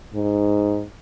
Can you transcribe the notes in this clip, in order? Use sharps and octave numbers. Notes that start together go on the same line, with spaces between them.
G#2